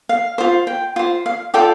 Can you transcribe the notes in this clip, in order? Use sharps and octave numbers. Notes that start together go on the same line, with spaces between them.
F5
F4 C5
G5
F4 C5
F5
F4 A4 D5 G5